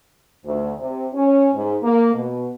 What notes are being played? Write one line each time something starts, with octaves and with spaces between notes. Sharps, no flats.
D2
C3
C#4
G#2
A#3
B2